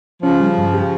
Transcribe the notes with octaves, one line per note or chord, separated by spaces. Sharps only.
C#3 F3 C#4
G3
G2
G4